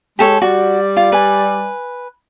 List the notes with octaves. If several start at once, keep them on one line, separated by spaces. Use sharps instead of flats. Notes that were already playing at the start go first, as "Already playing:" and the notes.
G#3 G4 A4 C#5
G3 F#4 D5
F4
B4 G#5